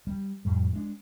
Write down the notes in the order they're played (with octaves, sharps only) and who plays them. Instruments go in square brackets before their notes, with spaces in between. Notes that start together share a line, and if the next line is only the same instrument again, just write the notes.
[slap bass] G3
F2 A2 G3
G#3 D4